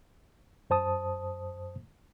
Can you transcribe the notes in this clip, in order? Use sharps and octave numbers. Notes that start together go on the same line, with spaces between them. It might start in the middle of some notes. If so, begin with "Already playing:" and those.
F#2 C5 A5 D#6